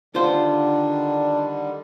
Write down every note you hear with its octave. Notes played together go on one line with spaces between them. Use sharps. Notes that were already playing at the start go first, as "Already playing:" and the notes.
D3 D#3 G3 D4 F4 C5